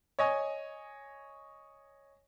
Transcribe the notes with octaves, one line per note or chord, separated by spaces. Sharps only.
C#5 D#5 G#5